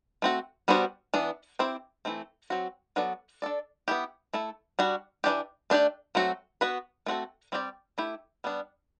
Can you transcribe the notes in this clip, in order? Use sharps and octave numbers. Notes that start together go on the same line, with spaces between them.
A3 C4 F#4
G3 B3 D4 F#4 C5
E3 B3 D4
C4 E4 G4 C5
E3 A3 C4
F#3 C4 F#4
F#3 B3 F#4 A4 D5
D4 A4 D5
B3 E4 G4
A3 E4 A4
G3 D4 F#4
E3 A3 D4 G4
A3 D4 G4 D5
F#3 A3 C4 F#4
B3 F#4 B4
A3 C4 F#4 A4
G3 C4 G4 B4 D5
A3 E4 G4
G3 B3 D4